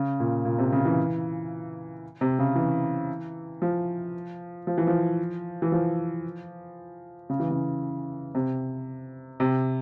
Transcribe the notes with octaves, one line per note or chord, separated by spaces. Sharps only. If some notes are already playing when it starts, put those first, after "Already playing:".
Already playing: C#3
A#2
A#2
C3
C#3
E3
C3
C#3
E3
F3
F3
E3
F3
E3
F3
C#3
E3
C#3
C3
C3